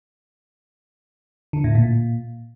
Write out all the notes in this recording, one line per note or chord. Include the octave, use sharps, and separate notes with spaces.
D3
A2
A#2